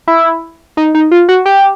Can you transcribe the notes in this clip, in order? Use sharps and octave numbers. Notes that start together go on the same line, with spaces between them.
E4
D#4
D#4
F4
F#4
G4